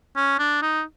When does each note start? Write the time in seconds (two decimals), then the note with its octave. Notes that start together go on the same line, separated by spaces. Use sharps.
0.16 C#4
0.39 D4
0.62 D#4